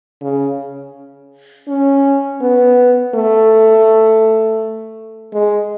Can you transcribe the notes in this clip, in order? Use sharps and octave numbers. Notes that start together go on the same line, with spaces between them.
C#3
C#4
B3
A3
G#3